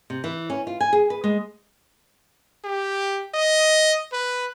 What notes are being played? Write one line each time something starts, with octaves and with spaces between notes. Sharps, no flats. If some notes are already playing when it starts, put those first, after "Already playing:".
C3
E3
C#4
F4
G#5
G#4
B4
G#3
G4
D#5
B4